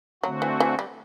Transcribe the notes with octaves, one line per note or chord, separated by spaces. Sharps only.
D3 F#3 A3 C4 F#4
E3
E3
G3